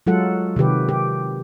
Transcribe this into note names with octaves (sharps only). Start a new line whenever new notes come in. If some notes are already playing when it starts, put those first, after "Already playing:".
F#3 G#3 F4 A4 F#5
C3 D#3 G4 B4
G4